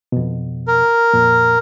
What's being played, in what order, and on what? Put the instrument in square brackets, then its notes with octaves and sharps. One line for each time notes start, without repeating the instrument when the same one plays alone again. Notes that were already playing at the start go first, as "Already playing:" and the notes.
[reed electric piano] F2 B2
[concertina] A#4
[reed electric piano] F2 A#2